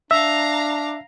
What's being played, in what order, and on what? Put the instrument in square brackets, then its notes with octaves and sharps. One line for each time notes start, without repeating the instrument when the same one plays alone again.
[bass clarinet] D4 [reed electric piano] E5 [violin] F5 A#5